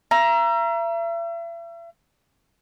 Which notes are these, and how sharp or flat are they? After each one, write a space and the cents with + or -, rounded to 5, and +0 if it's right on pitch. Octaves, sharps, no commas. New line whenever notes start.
E5 +40 A#5 +15